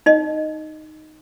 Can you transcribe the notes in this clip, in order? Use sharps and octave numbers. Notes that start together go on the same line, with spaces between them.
D#4 D#5